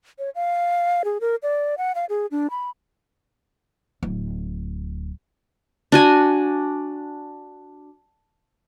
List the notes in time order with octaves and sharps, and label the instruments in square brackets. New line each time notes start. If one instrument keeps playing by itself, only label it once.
[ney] C#5
F5
G#4
A#4
D5
F#5
F5
G#4
D4
B5
[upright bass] D1
[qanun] D4 F#4 G#5